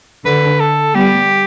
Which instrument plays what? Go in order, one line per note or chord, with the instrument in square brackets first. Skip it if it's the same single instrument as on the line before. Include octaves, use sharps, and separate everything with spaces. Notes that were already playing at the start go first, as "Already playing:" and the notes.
[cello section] D3 [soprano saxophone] B4
[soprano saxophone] A4
[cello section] G3 B3 [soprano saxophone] G4